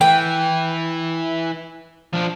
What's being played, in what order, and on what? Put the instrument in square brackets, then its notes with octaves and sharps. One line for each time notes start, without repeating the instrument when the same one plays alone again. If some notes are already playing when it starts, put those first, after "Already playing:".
[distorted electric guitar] E3 [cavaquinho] G5
[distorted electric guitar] F3 D4